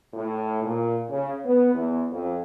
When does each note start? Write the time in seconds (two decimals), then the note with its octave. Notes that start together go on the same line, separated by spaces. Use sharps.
0.14 A2
0.62 A#2
1.09 C#3
1.44 B3
1.75 E2
2.11 F2